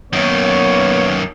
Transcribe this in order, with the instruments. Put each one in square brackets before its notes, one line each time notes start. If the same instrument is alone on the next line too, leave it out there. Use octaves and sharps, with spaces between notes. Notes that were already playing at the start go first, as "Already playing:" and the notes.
[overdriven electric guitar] F#2 D#3 [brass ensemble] A#3 B3 C#5